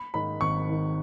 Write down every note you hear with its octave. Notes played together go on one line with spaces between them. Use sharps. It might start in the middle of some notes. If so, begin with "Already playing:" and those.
Already playing: B5
G#2 D#3 B5
G#1 C#6
G#2 D#3